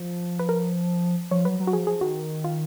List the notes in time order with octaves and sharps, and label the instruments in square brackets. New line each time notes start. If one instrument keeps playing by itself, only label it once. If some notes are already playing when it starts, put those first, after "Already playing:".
Already playing: [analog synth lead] F3
[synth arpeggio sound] B4
A#4
[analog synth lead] F3 [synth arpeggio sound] C#5
[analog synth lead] F#3 [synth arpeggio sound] B4
[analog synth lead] F#3
[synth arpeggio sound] F#4
[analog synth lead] F3 [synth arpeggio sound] G#4
[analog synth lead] F3 [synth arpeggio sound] G#4
[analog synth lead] D#3 [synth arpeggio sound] F#4
[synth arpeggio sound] F4